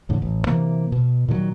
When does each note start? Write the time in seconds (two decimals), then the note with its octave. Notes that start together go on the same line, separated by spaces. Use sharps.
0.09 E2 A2 D3
0.22 A1
0.46 C3 E3 A#3
0.92 B2
1.28 A#2 D#3 F3 F#3